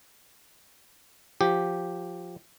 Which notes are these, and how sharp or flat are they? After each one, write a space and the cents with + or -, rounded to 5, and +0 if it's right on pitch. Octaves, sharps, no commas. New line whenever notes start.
F3 +10 G4 +0